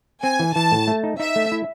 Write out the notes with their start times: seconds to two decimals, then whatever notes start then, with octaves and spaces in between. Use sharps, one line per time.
0.23 C4 G#5
0.39 E3
0.55 E3 A5
0.72 A2
0.88 A3
1.03 D#4
1.19 D#4 E5
1.36 A3
1.52 E4